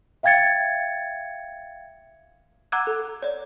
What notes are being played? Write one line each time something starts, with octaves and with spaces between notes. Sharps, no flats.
E5 F5 G5 G#6 A6 C#7
F#5 A#5 D6 E6 F#6 G#6
A4
C#5 D5